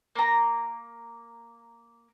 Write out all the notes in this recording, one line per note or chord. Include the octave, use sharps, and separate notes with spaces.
A#3 A#5